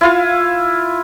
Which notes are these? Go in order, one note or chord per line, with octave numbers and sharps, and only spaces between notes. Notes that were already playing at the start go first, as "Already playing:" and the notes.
E4 F4 F5